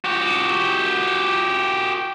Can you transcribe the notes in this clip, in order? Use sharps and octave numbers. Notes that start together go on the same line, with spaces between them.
F#4 G4